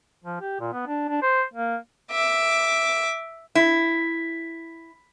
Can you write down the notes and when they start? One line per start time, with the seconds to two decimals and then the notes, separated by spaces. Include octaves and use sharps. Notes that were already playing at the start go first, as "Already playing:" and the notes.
0.24 F3
0.41 G4
0.60 A#2
0.73 B3
0.87 D4
1.09 D4
1.22 C5
1.54 A#3
2.12 E5 D6
3.55 E4